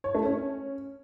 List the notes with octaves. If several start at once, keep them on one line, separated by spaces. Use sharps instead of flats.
C#5
A3
C#4